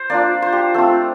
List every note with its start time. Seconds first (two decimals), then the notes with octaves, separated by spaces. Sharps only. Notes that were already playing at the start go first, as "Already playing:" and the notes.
Already playing: C5
0.10 A#3 D4 F4 D5
0.42 C5
0.52 G4
0.74 A3 C4 F4 A4